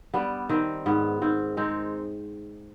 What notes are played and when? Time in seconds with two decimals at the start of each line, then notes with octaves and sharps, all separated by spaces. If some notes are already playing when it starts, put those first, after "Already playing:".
0.14 G3 B3 D4
0.49 D#3 C4
0.86 G#2 B3
1.22 G#2 C4
1.57 G#3 C4 D#4